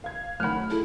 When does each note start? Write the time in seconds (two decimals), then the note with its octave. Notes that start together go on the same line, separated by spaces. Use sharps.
0.04 F5 G#6
0.40 F#2 D#3 A3 F#5 B5 F6
0.70 E4 G#4 A4